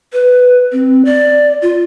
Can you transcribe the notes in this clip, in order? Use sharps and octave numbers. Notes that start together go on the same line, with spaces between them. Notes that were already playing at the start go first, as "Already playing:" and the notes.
B4
C4
D5
F4